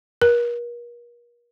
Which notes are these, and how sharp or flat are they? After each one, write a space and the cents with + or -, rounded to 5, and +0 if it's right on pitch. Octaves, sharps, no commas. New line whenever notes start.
A#4 +40